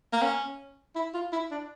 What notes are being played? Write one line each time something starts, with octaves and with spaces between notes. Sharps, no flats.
A#3
C#4
E4
F4
E4
D4